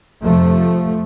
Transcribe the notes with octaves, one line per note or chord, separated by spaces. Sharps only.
F2 C3 F3 A3